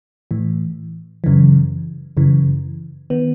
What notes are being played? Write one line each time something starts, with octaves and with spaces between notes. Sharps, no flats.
A2 E3
F#2 C#3 E3
F#2 C#3 E3
D#3 B3